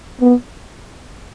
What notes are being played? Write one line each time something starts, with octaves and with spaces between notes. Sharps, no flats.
B3